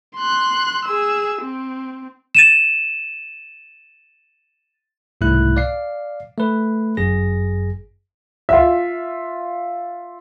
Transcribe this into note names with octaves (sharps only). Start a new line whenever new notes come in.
C6 F#6
G#4 E6
C4
A6 D#7 E7
C2 G#2 B2 A3 E4 F#6
D5 F5 C7
A3 B4
G1 F#2 G#4 A#6
F4 E5